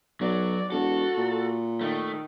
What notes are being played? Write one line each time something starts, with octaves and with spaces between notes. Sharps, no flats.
B1 F#3 D5
E1 F#4 A4
A#2
D#3 A3